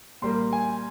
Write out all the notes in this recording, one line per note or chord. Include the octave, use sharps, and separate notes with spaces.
A#2 G3 A#3 C6
G#5